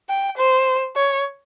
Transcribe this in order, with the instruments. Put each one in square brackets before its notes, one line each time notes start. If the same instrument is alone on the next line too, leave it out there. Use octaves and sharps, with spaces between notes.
[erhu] G5
C5
C#5